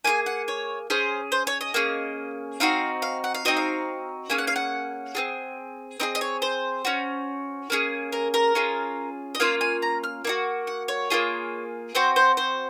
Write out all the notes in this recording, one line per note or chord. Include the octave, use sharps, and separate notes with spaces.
A#3 F4 G#4 G#5
F#5
C#5
C#4 G#4 C5
C5
C#5
D#5
A#3 C#4 G#4
C4 D#4 F#4 F5
F5
F#5
F5
C4 D#4 F#4 D#5
F5
A#3 C#4 G#4 G#5
F#5
F5
F#5
C4 F4 G#4
C4 D#4 G#4 D#5
D#5
C#5
C5
C#4 F#4
A#3 C#4 G#4
A#4
A#4
C#4 F4 G#4
D#5
A#3 C#4 F4 F5
G#5
A#5
F6
A#3 D#4 F#4
F#5
C#5
A#3 C#4 F4 G#4
C4 F#4 C5
C5
C5